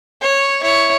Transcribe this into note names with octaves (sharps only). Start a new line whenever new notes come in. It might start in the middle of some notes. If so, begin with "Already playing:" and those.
C#5
E4 C#5